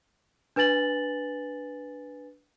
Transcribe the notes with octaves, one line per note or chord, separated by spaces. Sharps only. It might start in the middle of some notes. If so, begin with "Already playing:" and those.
D4 B4 G#5 A6 F#7